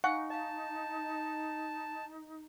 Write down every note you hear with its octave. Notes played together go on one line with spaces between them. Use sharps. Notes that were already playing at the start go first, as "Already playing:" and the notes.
D#4 F5 F#5 G#5 C#6
D#5 F5 A5